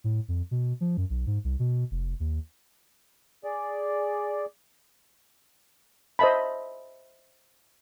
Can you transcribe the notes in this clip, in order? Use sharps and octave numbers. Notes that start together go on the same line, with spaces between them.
A2
F2
B2
F3
F#2
B1
G#2
C2
B2
F1
D#2
G#4 D5
C5 D#5 E5 A5 B5